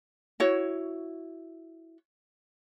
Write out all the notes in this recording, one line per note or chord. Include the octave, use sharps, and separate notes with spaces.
E4 F#4 C#5